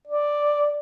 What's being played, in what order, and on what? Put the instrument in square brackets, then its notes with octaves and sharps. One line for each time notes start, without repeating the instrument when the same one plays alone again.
[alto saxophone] D5